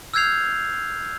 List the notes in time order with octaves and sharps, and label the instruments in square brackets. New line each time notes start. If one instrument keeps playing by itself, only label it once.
[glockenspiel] E6 F6 G6 G#6 C7 F7